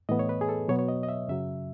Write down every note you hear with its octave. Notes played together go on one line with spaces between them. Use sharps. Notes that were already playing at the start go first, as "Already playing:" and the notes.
A2 E3 B3 D#5
C#5
B4
G#4
A4
B2 F#3 B3 C#5
C#5
D#5
D#5
E5
F#2 C#3 F#3 E5